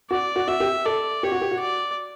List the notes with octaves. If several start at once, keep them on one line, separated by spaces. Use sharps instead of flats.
F#4 D5
F#4
F#4 E5
G4
A4 D5
G4 C#5
F#4
G4
F#4
D5